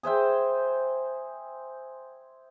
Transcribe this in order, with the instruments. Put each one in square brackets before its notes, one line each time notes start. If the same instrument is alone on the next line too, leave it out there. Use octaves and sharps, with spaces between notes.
[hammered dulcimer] G#4 C5 E5 G5